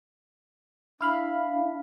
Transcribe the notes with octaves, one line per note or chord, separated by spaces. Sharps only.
D4 E4 F5 B5